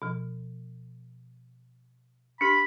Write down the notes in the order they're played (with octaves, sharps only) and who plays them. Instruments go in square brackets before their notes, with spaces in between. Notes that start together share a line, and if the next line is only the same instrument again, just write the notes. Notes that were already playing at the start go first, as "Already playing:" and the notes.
[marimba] B2 F3
[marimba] D4 G4 [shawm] B5